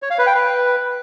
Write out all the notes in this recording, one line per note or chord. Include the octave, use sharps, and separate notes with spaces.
C#5
F5
B4
G5
B4